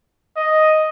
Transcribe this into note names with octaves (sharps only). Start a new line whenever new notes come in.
D#5